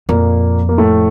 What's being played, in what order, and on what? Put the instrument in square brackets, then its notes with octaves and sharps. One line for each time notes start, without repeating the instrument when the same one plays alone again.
[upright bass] F2 [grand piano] A#2 A#3
[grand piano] A#3
A2 A3